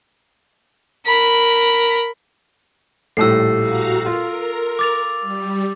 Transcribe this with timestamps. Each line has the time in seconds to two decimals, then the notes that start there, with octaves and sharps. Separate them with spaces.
1.06 A#4 B5
3.17 A#1 A2 G3 A4 E6 C7
3.58 F#4 F5 A#5
4.06 F4 A#4
4.79 D6 A6 F7
5.21 G3